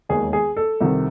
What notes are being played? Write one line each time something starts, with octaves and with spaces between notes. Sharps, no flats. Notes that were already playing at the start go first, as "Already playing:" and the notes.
E1 D#2 D#3 G#3 G#4
G#4
A4
C2 C3 D#3